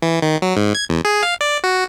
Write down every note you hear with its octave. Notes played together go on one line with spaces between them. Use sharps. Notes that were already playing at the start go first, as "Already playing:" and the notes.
E3
D#3
F#3
G#2
G#6
E2
G#4
F5
D5
F#4